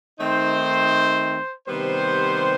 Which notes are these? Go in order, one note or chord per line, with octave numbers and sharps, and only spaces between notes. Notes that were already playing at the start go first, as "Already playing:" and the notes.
D#3 A3 C4 D#4 C5
C3 D#3 G3 B3 C5